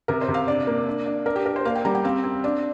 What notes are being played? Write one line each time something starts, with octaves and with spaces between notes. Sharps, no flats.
C3 A#4
C5
C3
F5
D4 D5
A#3
D4
D4
D4 A#4
G4
D4 A#4
C5
A#3 F5
G5
G3 A#5
G5
C4 F5
C4
D4